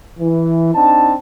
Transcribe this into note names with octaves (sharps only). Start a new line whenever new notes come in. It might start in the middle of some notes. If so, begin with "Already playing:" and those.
E3
C4 D4 D#4 A5